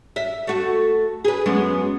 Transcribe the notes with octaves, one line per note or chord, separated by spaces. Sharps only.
E5
A3 F#4
G#4 B4
F#2 G#3 B3